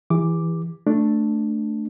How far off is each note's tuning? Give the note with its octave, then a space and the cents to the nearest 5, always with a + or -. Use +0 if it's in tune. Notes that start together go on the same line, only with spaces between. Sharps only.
E3 +0 G4 +45 D6 +0
A3 +0 D4 +0